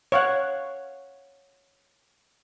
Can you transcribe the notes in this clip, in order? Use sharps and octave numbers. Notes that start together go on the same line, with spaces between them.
C#5 F5 F#5